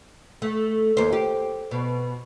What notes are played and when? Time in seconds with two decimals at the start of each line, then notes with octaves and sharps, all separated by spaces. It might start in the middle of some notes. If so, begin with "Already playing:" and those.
0.42 A3
0.97 D#2 C5
1.12 G4
1.71 B2